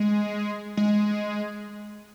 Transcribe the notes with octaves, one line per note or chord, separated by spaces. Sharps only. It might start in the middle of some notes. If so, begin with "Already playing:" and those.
Already playing: G#3
G#3